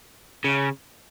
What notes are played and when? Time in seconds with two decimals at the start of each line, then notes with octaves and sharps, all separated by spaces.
0.44 C#3